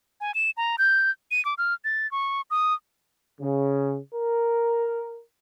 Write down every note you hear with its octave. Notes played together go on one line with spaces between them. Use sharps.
G#5
E7
A#5
G6
D#7
D6
F6
A6
C#6
D#6
C#3
A#4